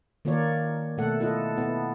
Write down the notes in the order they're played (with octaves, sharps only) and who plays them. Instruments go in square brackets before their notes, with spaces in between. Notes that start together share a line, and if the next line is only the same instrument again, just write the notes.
[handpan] D#3 A#3 F4 A#4 C#5 D5
B2 A3 A4 F#5
E4 F4 A4 D#5
B3 E4